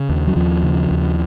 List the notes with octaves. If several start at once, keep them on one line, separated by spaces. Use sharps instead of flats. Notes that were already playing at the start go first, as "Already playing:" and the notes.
Already playing: C#3
D#2
F#3
D#2 F3
C#3
D#2